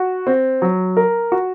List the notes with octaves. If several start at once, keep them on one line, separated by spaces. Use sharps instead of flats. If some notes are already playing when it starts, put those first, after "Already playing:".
Already playing: F#4
C4
F#3
A#4
F#4